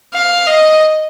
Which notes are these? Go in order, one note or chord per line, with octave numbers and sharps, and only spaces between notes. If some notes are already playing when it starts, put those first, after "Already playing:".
F5
D#5